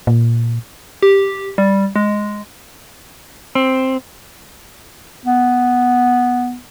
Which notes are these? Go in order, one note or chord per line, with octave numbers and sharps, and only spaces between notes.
A#2
G4
G3
G#3
C4
B3